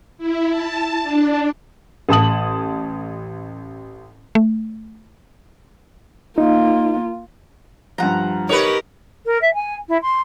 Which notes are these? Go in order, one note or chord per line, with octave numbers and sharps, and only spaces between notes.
E4
A5
D4
A1 A5 D#6 F#7
A3
A#3 D#4 F4
G2 F3 F#5 A#5
D#4 G4 A#4 B4 C#5
A#4
E5
G#5
E4
C6